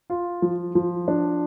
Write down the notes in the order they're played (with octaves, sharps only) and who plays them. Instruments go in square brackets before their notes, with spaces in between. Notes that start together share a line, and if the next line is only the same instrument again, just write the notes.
[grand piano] F4
F3
F3
D4